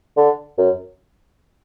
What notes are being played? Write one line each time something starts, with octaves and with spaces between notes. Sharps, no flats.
D3
F#2